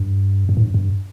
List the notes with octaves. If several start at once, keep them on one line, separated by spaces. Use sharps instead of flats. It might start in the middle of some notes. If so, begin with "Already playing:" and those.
Already playing: G2
G2
A2
G2
G2